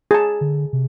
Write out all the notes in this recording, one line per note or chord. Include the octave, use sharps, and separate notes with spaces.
G#4 A5
D3
C3